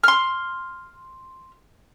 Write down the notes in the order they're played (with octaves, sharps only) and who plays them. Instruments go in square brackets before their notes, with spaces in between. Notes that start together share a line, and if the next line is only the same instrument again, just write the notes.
[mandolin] C6 F6